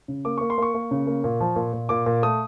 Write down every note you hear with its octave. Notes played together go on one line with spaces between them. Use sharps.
C#3
A#3 D6
A#3 C#6
C6
A#3 C#6
A#3
C#3
A#3
A#2
F3
A#2
A#2
A#2 D6
A#2
A3 D#6